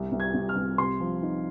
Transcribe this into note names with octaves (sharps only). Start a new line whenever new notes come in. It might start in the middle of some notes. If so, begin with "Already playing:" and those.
Already playing: C2
C2
G#6
C2
F6
C2
C3 C6
F3
D#4